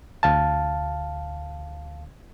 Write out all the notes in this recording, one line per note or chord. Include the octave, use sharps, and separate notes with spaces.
D2 F5 A5